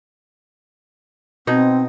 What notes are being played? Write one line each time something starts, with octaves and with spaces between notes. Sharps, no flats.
B2 C4 D#4